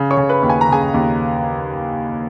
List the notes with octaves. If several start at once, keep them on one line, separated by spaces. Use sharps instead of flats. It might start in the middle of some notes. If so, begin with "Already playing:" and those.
Already playing: C#3
C#5 C#6
C#3
B4 B5
D#2
G#5
A#5
C#3 G#4 G#5
D#2